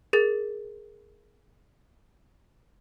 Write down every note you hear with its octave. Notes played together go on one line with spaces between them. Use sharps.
G#4 A#4 A6